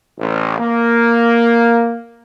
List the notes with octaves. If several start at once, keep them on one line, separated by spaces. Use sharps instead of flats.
A1
A#3